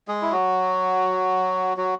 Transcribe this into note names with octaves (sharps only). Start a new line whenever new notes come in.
G#3 G#4
E4
F#3 F#4
F#3 F#4